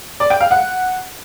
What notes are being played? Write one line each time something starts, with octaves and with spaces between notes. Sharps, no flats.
D5
G5
F5
F#5